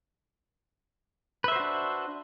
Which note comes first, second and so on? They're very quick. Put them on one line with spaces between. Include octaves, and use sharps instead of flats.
B4 E5 C5 F#4 D4